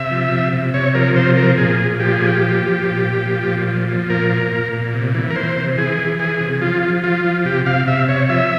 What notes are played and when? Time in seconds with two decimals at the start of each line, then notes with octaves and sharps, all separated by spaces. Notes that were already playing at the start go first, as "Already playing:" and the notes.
Already playing: C3 E5
0.11 F3
0.32 C3
0.53 C3
0.74 C3 C#5
0.95 F3 A#4
1.16 C3 C5
1.37 F3 A#4
1.58 A#2 G#4
1.79 A#2
2.00 F3 G4
2.13 G#4
2.21 A#2
2.27 G4
2.42 F3
2.63 F3
2.84 A#2
3.05 A#2
3.26 F3
3.47 A#2
3.68 F3
3.88 F3
4.10 A#2 A#4
4.31 A#2
4.52 A#2
4.73 A#2
4.94 C3
5.15 E3
5.30 A#4
5.36 E3 C5
5.57 C3
5.78 E3 G#4
5.99 E3
6.19 E3 G#4
6.40 C3
6.61 F3 F4
6.83 F3
7.03 F3 F4
7.25 F3
7.45 C3 G4
7.66 C3 F5
7.87 C3 E5
8.08 C3 C#5
8.29 F3 E5